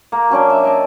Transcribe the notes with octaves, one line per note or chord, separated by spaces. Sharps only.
A#3
F#3 C#4 D4 G5
E5
D5 D#5 G5 A5